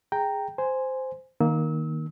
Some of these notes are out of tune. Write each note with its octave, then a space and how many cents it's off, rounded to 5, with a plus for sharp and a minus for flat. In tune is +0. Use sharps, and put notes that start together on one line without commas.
G#4 -5 G5 +0 A#5 -10
C5 -10 G#5 +0
D#3 +0 A#3 +10 E6 -35